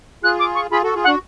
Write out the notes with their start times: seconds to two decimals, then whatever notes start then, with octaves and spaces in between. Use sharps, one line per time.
0.23 F4 G#4 F#6
0.39 D6
0.55 C#6
0.71 F4 G#4 B5
0.83 F#4 A4
0.95 F4 G#4
1.04 F#5
1.07 D4 F#4